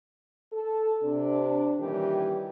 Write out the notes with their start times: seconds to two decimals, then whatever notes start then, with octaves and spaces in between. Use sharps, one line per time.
0.52 A4
1.03 C3 D4
1.79 A#2 D#3 E3 G3 C#4 G4